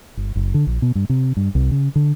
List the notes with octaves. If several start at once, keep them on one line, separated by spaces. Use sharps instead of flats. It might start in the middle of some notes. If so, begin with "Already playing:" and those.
G1
F#1
D3
A#1
B2
G2
C3
G2
C2
C#3
D3